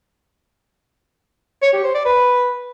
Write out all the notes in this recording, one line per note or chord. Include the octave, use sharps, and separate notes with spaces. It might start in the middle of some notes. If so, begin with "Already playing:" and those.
C#5
G4
C5
D5
B4